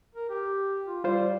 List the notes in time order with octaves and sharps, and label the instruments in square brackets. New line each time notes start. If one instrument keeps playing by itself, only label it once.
[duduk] A#4
G4
F4
[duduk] G3 [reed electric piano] F4 C5